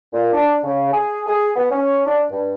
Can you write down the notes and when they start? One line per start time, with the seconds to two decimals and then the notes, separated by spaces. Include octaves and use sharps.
0.12 A#2
0.33 D4
0.64 C#3
0.92 G#4
1.26 G#4
1.56 B3
1.71 C#4
2.06 D4
2.30 G2